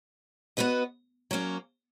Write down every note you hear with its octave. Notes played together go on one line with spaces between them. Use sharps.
B3 F#4 B4 D#5
F#3 A#3 C#4